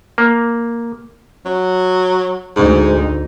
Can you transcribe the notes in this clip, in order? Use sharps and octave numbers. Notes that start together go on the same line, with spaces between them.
A#3
F#3
D2 G#2 D#4